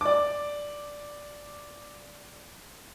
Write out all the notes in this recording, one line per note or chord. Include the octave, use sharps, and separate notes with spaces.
D5 D6